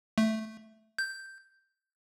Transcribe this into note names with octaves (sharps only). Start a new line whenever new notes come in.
A3
G6